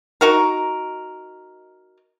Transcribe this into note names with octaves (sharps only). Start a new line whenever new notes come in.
D#4 F#4 A#4